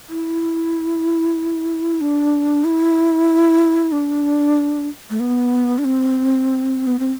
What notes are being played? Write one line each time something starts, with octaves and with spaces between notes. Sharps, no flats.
E4
D4
E4
D4
A3
B3
D4
C4
B3
C4